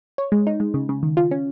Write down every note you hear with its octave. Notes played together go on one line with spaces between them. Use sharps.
C#5
G#3
D#4
G#3
C#3
C#3
D#3
F4
C#4